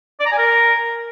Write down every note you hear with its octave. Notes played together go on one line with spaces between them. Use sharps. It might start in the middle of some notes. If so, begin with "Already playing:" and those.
D5
A#5
G#5
A#4